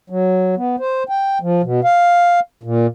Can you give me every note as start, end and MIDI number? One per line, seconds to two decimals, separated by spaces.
0.10 0.55 54
0.57 0.76 59
0.79 1.03 72
1.09 1.38 79
1.41 1.62 53
1.63 1.80 47
1.84 2.40 77
2.64 2.87 46